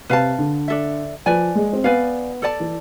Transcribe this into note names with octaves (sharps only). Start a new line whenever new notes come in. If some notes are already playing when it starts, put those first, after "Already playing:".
C3 B4 F5 A5
D3
D4 A4 E5
F3 B4 D5 G#5
G#3
C4
B3 B4 D5 F5 G#5
A4 D5 A5
E3